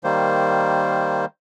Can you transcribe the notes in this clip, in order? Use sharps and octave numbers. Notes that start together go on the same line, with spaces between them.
D#3 G3 A#3 C5